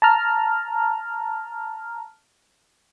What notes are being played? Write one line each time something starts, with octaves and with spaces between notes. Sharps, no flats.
A5 A#5 F6